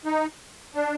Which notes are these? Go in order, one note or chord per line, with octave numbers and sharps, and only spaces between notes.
D#4
D4